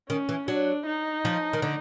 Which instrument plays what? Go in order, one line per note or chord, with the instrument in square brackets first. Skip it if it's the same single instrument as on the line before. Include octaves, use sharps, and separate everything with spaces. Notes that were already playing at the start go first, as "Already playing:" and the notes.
[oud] D#3 [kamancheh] C#4
[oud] E3
[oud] F#3 [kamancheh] D4
[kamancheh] D#4
[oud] F3
D#3
D3